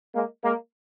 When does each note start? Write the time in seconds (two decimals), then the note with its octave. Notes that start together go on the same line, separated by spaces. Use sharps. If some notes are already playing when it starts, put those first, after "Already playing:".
0.14 G#3 A#3
0.43 G#3 A#3